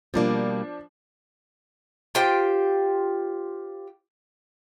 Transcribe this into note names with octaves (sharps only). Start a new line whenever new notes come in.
B2 F3 G3 A#3 D4
F4 G4 C5 G5